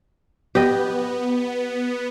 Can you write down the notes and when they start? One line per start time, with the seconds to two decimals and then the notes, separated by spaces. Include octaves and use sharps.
0.55 B3 G4 D#5